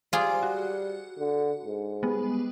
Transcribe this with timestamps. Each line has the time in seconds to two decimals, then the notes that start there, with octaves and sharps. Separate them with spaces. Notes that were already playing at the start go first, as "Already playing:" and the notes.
0.13 G3 F4 G#4 C5 D6
0.43 F#4
1.18 D3
1.64 G#2
2.03 G3 G#3 B3